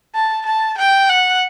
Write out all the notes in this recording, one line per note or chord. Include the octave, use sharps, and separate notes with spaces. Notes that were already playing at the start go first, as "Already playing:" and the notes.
A5
A5
G5
F#5